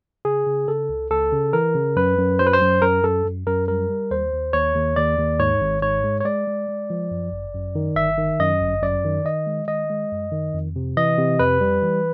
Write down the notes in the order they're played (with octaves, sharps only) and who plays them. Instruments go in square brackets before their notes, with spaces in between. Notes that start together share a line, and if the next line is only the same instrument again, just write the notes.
[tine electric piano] C#3 G#4
C#3
C#3 A4
C#2
C#2 A4
C#3
E3 A#4
C#3
F#2 B4
F#2
F#3 C5
B4
C5
F#2
F#2 A#4
F#2 A4
F#2
F#2 A#4
G3 A#4
G3
D#2 C5
D#2
D#2 C#5
D#2
D#2 D5
D#2
G#2 C#5
G#1
G#2 C#5
G#3
C#5
G#3 D5
G#3
G#3
F3
F#2
G1
F#2
D#3
G1 E5
D#3
F#2 D#5
G1
F#2 D5
D#3
D#3 D#5
G#3
D#3 D#5
G#3
F#2
D#3
F2
C3
E3 D#5
C3
F2 B4
G3
E3